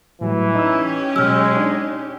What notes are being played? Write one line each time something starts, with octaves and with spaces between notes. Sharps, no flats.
A2 E3 F#3 G3
C#4 D#4 G4 E6
B2 F#3 G#3 E6 F6
D4 D#4